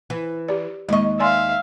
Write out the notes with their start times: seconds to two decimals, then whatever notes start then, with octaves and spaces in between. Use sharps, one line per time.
0.10 E3
0.48 G4 D5
0.89 D#2 G#3 D#5 C#6
1.20 D5 E5 F5 G#5 C6